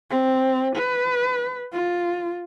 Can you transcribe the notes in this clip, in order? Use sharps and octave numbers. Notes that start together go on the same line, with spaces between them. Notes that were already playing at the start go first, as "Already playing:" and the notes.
C4
B4
F4